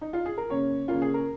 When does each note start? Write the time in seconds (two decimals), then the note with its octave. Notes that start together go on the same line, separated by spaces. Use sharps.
0.01 D#4
0.13 F4
0.26 G#4
0.38 A#4
0.50 C#3 A#3 C#4 C#5
0.88 C#3 A#3 C#4 F4
1.02 G#4
1.14 A#4